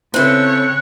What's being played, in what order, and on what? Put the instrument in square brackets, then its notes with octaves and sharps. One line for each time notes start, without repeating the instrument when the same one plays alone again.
[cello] C#3 C#5 [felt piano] B3 E4 B4 [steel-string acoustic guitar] C4 A4 [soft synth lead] F#6